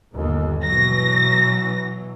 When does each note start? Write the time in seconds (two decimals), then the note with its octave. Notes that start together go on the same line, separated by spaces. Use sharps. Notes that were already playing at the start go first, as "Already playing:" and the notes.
0.14 G1 D#2
0.64 B2 E3 F#3 A#6